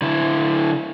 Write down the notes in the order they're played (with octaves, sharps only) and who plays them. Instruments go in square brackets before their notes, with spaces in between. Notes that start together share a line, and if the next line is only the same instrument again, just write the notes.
[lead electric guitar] D3 E4